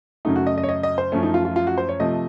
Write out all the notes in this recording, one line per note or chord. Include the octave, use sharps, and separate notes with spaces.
F#2 C#3 F#3 A3 D#4
F#4
D#5
D#5
C#5
D#5
D#5
C5
F#2 F3 A3 C#4
D#4
F4
F4
F4
F#4
C5
C#5
C3 F3 A3 D#5